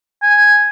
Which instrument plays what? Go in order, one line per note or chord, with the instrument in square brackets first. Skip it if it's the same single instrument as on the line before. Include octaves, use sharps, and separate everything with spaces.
[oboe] G#5